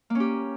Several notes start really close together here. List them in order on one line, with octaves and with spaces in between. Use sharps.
A#3 C#4 G4